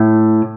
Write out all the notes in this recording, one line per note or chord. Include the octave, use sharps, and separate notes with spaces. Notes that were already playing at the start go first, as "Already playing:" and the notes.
Already playing: A2